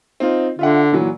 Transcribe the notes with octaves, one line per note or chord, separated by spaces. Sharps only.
C4 D#4 F4
D3 F4 E5 F#5
A#2 E3 F#3